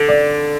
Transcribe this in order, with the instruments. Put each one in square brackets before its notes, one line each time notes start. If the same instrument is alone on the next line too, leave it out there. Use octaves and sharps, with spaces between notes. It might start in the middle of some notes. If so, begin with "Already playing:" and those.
Already playing: [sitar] D3 [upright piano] A4
[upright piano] D5